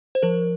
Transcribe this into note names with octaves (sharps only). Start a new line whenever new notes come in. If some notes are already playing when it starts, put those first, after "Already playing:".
C5
F3 A#4